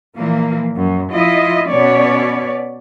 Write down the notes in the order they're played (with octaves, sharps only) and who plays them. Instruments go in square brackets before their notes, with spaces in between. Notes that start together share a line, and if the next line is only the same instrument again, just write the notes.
[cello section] A#2 E3 F3 A#3
F#2
F3 E4 F4 D#5
B2 B3 C#4 C#5 D5